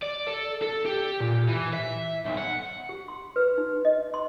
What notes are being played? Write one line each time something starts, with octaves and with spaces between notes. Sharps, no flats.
D5
A4
A4
G4
A#2
E3
E5
B1
F#5
G4
C6
B4
D#4
D#5
C6